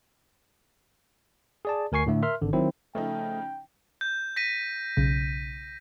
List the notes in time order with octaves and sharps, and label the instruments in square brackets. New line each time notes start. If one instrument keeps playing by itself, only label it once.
[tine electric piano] G#4 D5 A5
D2 A#4 G#5 C#6 C7
A2 D3 A3
A#4 E5 C6 F6
G#1 D3
D#3 F#3 C4 E4 C5
[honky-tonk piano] C#3 F3 D#4 [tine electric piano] A3 [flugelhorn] G5
[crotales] G6
A#6 B6 D#7
[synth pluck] B1 C#3